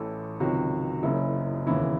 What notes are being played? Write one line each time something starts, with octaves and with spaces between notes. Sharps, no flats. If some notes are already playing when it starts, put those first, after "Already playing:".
Already playing: A1 A2 E3 A4
C#2 C3 D#3 F#3 F#4
F#1 F#2 C#3 E4
E1 D#2 C#3 E3 E4